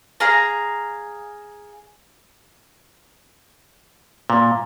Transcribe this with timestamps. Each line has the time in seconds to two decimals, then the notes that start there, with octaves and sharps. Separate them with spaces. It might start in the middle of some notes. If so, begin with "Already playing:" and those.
0.20 G#4 F5 A#5
4.30 A#2